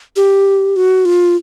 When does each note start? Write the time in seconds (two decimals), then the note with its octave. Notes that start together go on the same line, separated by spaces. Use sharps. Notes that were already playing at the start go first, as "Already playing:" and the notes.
0.16 G4
0.76 F#4
1.05 F4